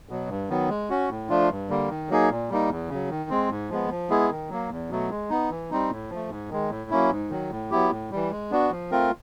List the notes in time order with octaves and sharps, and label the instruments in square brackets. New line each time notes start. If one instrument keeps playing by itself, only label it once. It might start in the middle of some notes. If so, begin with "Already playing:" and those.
[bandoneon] B2 F#3
G2
D#3 F#3 B3
G#3
C#4 F#4
A2
F3 A3 D4 F4
G2
D3 G3 A#3
D#3
F#3 A#3 D#4 G#4
A#2
G3 A#3 D#4
E2
C#3 F#3
D#3
G#3 C4
G#2
F3 G#3 B3
F3
G#3 B3 E4 G#4
D#3
F#3 A#3
E2
B2 F#3 A3
G#3
B3 D#4
E3
G3 C4 D#4
A2
F3 A3
G#2
D#3 G#3
A2
F#3 A#3 C#4 E4
G#2
D#3 F#3
A2
F#3 B3 E4 G4
A2
E3 G3
G#3
B3 D4 F#4
F3
A3 C4 F4 A#4